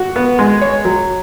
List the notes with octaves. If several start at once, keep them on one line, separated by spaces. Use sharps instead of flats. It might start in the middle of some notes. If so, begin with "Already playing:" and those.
Already playing: F#4
B3
G#3
C#5
F#3